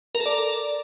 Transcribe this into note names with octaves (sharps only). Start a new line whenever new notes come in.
A#4
A4
D5